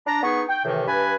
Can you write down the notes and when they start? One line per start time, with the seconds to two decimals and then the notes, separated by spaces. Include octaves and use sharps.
0.06 D4 A#5
0.23 B3 D#4 G#4 C#6
0.48 G5
0.65 A2 C3 D#3 E3
0.87 G2 B4 G#5 B5